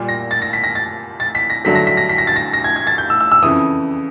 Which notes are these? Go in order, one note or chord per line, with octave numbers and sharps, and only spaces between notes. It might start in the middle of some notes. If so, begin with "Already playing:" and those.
Already playing: A#2 G3
A#6
A6
A#6
B6
A#6
A6
A6
B6
A#6
G2 D3 F#3 A3 B6
A#6
B6
A#6
B6
A#6
A6
A#6
A#6
G#6
G#6
A6
G6
E6
E6
E6
F2 C#3 E3 D#6